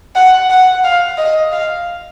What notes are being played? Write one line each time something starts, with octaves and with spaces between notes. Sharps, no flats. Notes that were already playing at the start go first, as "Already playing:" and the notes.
F#5
F#5
F5
D#5
F5